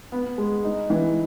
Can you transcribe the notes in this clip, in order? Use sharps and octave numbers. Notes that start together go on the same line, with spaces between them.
B3
G#3
D#4
E3